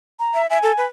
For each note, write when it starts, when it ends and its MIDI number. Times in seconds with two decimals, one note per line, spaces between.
0.20 0.42 82
0.34 0.47 76
0.50 0.58 76
0.50 0.85 80
0.63 0.72 69
0.78 0.86 71